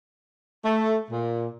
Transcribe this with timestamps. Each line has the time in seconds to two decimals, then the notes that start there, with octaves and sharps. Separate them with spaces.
0.65 A3
1.10 A#2